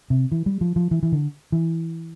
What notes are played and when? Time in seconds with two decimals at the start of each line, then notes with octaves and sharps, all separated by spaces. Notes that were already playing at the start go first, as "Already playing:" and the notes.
0.10 C3
0.32 E3
0.46 G3
0.61 F3
0.76 F3
0.91 E3
1.03 E3
1.12 D3
1.52 E3